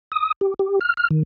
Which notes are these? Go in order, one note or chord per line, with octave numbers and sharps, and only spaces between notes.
D#6
G4
G4
F6
F6
D#3